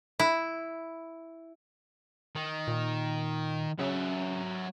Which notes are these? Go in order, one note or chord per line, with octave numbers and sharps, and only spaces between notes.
E4
D#3
A#2
C#3 F#3 E5